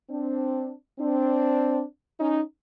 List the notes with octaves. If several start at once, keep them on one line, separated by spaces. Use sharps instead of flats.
C4 D4
C4 D4
C#4 D#4